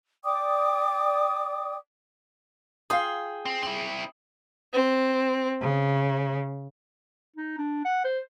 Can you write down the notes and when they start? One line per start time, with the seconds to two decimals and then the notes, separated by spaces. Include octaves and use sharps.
0.24 D5 G5 D6 D#6
2.90 F4 G#4 F5 G5 D#6
3.45 C4
3.63 C4 E4 F#7
4.73 C4
5.61 C#3
7.36 D#4
7.58 D4
7.85 F#5
8.04 C5